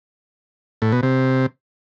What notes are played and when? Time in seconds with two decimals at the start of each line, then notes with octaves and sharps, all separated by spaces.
0.82 A2
0.92 B2
1.03 C3